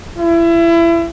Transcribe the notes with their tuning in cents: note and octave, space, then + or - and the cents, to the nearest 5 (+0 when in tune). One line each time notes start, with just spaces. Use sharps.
E4 +30